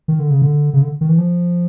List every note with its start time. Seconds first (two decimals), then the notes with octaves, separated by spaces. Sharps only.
0.08 D#3
0.19 D3
0.31 C#3
0.42 D3
0.73 C#3
0.82 D3
1.01 D#3
1.09 E3
1.18 F3